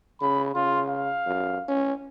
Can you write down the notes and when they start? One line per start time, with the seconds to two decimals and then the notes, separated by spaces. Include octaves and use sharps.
0.21 C#3 B5
0.55 C#3 F4
0.89 F5
1.27 F#2
1.69 C#4